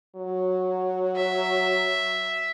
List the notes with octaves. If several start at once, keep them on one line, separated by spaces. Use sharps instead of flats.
F#3
E5